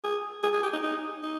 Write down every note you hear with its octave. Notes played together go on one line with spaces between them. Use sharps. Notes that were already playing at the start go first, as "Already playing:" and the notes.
G#4
G#4
G#4
G4
D#4
D#4
D#4